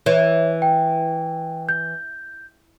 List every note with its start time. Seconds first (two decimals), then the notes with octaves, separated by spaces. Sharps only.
0.06 E3 C#5
0.62 G5
1.69 G6